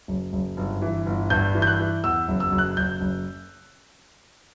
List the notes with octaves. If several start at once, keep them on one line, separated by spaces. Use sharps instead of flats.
F#1
F#1
G1
E3
G1
G2 G6
E3
G6
F#6
E3
E2 E6
F#1
E6
F#1
F#6
F#1 G6
F#1